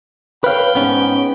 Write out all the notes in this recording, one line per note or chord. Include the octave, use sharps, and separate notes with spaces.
B4 C#5 F5 G5 B5
G#2 B3 C#4